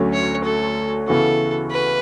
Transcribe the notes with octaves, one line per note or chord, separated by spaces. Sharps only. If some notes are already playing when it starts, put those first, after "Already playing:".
Already playing: D2 D3 F#3 A3 C#4
C#5
A4
C#3 E3 B3 F#4 A4
B4